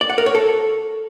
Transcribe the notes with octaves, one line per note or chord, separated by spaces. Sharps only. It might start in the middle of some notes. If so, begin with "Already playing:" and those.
D5
F#5
A#4
C#5
A4